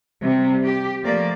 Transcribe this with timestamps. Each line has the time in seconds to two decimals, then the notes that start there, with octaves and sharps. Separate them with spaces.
0.21 C3 G3
0.64 G4
1.03 F3 A3 A#3 D5